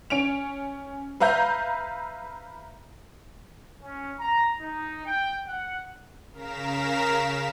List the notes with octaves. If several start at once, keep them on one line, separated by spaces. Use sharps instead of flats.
C#4 D7 F7
B4 E5 F5 A#5 G6
C#4
A#5
D#4
G5
F#5
C#3 A#4 F5 A#5 B6 E7